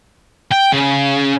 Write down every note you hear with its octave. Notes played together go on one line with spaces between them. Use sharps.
G5
C#3